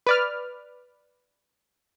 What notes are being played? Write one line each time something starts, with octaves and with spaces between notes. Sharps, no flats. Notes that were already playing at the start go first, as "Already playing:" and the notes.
B4 D5 F6